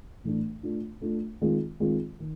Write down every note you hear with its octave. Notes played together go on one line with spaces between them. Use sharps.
A2 E3 A3 D4
A3 D4 F4
A3 D4 F4
D#3 G#3 C4 F4
D#3 G#3 C4 F4
D#3